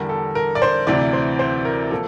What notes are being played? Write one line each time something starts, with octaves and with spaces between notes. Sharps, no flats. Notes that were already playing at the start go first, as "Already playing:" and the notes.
Already playing: E2 D3 G3 D4 A#4
A4
A#4
D5
C5
D2 C3 E3 D5
C5
C5
A#4
F3 A#3 A4